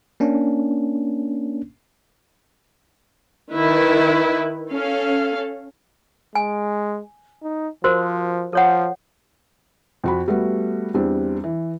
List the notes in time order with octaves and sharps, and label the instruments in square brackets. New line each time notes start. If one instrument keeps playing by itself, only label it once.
[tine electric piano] A#3 C#4 D4
[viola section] D#3 E4 B4
C#4 A4 F5
[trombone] G#3 [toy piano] G#5
[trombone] D#4
[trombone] F3 [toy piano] F#4 A#4 C5
[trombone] F3 [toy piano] A4 C#5 F#5
[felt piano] F2 F#4 B5
G3 A3 B3 F#4
E2 G3 C4 D4
E3